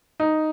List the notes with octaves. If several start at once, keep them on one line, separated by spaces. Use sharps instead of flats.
D#4